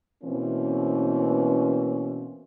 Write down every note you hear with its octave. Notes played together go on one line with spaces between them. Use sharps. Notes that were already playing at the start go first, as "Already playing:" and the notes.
B2 E3 A#3 C4 C#4